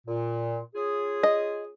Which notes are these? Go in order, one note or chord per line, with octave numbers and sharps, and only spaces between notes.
A#2
C#4 F4 G#4
D#5